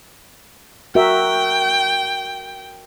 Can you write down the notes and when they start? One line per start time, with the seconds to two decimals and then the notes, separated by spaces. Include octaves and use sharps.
0.95 F#4 A#4 E5 G5